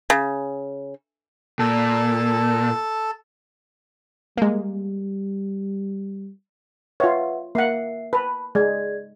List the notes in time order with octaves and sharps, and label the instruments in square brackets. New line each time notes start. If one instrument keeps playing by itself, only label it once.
[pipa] C#3
[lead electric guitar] A#2 [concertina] A4 A5
[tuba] G3 [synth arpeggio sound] G#3 A#3
[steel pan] F4 C#5 [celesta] B4 E5 F#5
[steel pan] A#3 F#5 [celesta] E5 C7
[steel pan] B4 [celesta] A5 B5
[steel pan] G#3 [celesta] G#4 D5 G#6